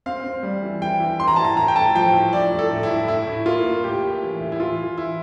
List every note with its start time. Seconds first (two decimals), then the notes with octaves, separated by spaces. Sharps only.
0.06 C4 F5
0.24 C4
0.43 G3
0.62 E3
0.82 E3 G5
1.00 E3
1.19 E3 C6
1.28 A#5
1.36 E3 A5
1.45 A#5
1.56 A2 A#5
1.68 G5
1.76 A2 A5
1.94 F3 G5
2.13 A2
2.33 A2 D5
2.51 A2
2.59 A4
2.71 A2
2.83 E4
2.90 A2
3.08 A2 E4
3.27 A2
3.46 A#3 F4
3.66 A#3
3.84 A2 G4
4.03 A2
4.23 E3
4.40 A2
4.52 E4
4.60 E3 F4
4.78 E3
4.97 E3 E4